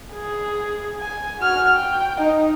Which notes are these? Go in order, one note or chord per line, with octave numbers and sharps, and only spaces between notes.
G#4
G#5
F#4 F6
G5
D#4 D#5